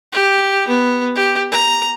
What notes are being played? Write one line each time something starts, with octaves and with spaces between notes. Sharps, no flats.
G4
B3
G4
A#5